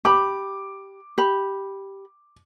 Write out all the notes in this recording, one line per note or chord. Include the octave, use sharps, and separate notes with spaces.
G4 B5 D6
G4 B5